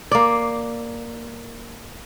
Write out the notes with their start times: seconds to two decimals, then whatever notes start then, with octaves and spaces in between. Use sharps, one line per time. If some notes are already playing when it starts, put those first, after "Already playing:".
0.11 A#3 D5